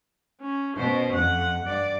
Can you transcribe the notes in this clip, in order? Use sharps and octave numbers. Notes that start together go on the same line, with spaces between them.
C#4
B2 C#4 C5
F2 F#5
G2 D5